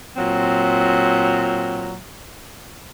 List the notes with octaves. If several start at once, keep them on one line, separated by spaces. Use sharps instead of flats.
A#2 F#3 C4